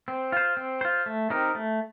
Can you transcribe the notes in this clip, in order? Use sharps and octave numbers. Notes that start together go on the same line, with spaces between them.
C4
F4 C5
C4
F4 C5
A3
C4 D#4 G4 A#4
A3